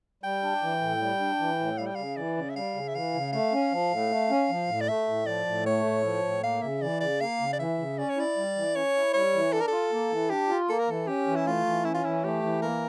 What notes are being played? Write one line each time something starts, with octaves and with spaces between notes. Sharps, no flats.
G3 G5
D4
E3
A2
G3
D4
E3
A2
G3 F5
G5
C#3 F5
E3 D5
C#3
E5
G3 F5
C#3
E5
E3 F5
C#3
A3 F5
C#4
F3
A2
A3
C#4
F3
A2
D5
A3 E5
A2
F3 D5
A2
A3 C#5
A2
F3
A2
A#3 F5
C#3 E5
E3 D5
C#3 D5
A#3 F5
C#3
D5
E3 E5
C#3
C#4 D5
C#5
E4 D5
G3
E3
C#4 C#5
E4
G3 C#5
E3
D4 A4
A#4
F4 A4
A#3
E3
D4 G4
F4
A#3 A4
A#4
E3 A4
C#4 G4
E3
E4
A3 F4
E3
C#4 E4
F4
E3 E4
A3 G4
E3
A#3 A#4